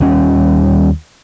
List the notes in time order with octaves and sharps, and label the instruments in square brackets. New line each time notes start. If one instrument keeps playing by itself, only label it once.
[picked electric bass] D#2 G3 C#4